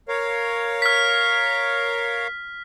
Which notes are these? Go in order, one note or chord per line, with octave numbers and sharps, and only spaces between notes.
A#4 C#5 F5
F6 B6